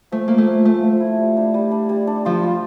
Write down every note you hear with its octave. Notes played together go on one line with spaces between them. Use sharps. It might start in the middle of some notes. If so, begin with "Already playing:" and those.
F3 A3
F3 A#3
A3
F3
F3 A3
F3
E4
G3
D4
G3
D4
G3
D4
F3 F4
F4